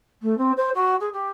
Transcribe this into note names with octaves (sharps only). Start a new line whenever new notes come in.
A3
C4
C5
F#4
G#4
G4